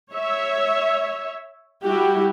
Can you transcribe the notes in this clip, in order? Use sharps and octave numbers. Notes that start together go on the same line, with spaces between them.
C#5 E5
G3 E4 F#4 G4